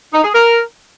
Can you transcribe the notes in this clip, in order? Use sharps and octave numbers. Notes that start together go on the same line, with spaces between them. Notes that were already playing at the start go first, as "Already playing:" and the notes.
D#4
G#4
A#4